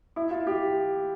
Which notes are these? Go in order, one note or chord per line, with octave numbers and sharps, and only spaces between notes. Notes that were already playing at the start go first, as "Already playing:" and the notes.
E4
F4
G4